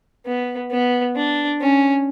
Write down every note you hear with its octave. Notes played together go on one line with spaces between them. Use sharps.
B3
B3
D4
C#4